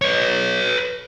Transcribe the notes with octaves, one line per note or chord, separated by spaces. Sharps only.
B4 C#5